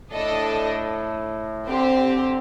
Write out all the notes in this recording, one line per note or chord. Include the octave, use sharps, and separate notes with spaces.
A2 D4 A4 D#5
D3 C4 G4 C5